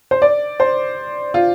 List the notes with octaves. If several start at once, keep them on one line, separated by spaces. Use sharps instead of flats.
C5
D5
C5
F4